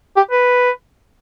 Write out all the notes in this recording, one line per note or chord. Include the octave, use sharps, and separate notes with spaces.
G4
B4